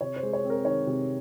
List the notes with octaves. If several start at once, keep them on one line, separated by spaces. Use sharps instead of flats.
C3 C#5
C5
G#3
C#5
C4
A#4
D#3 C#5
C3